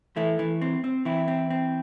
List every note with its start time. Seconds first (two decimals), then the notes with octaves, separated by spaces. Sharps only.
0.16 E3 A3 E4
0.39 E3
0.61 C4
0.84 C4
1.05 E3 C4 E4
1.28 C4
1.50 C4